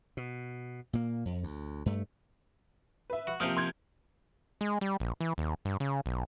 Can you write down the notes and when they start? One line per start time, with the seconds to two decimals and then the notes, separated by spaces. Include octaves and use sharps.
0.17 B2
0.93 A#2 A#3
1.25 F2
1.43 D2
1.86 G2 A3
3.10 B4 E5
3.27 F#4
3.40 C3 F3 A#3 D#6 F6 G6
3.57 C6 G6 G#6
4.61 G#3
4.81 G3
5.00 A#1
5.21 E3
5.38 D#2
5.65 G2
5.80 C#3
6.06 B1